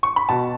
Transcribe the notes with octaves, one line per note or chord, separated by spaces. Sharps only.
C#6
B5
B2 A5